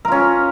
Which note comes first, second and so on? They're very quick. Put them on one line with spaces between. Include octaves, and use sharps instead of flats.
A#4 F4 C#4